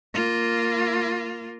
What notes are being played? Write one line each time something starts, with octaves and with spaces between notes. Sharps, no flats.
A#3 F4